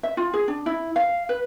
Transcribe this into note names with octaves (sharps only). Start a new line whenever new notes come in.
E5
F4
G#4
D4
E4
F5
B4